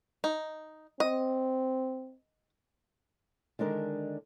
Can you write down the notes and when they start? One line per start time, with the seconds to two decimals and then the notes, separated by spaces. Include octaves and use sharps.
0.24 D#4
1.00 C4 D#5
3.59 D3 D#3 G#3 D4 A#4